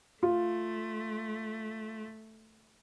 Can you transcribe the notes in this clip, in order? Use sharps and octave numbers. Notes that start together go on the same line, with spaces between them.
A3 F4